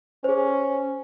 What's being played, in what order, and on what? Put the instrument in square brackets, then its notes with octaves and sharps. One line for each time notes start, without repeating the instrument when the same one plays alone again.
[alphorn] C#4 [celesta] G#4 C5